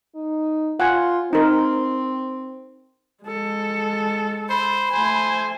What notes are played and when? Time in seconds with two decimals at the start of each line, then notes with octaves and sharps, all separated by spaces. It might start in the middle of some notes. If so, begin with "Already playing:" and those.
0.15 D#4
0.80 F4 F#5 G#5
1.33 C4 D#4 A#4
3.24 G#3 A4
4.50 C5 B5
4.92 A3 C5 G#5